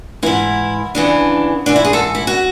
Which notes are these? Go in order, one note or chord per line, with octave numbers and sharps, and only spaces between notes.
G#2 E3 E4
E2 C#3 E3 D4
G#2 E3 D4
E4
G#4
A4
E4
F#4